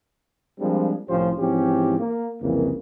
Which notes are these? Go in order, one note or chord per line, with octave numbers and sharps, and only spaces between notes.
F3 G3 G#3 A#3 C4 D4
C2 A2 F3 C#4 G4 C5
G#2 E3 F3 C4 C#4 G4
A#3
C2 F2 C#3 E3 A#3